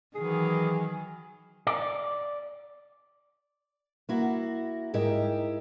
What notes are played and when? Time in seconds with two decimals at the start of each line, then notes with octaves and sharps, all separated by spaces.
0.15 D#3 E3 F#3 G#4
1.67 D5
4.09 A#3 E4 F#4
4.94 G#2 E4 G4 G#4 A#4 D#5